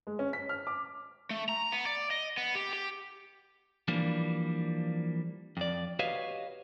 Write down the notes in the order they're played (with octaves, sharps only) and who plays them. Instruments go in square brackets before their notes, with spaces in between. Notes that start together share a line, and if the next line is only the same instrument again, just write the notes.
[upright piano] G#3
C#4
B6
F6
D6
[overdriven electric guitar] A3
A#5
B3
D5
D#5
B3
G4
G4
[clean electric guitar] E3 F3 G3 A#3 D4
F2 D5
F#4 G4 B4 C#5 D#5 F5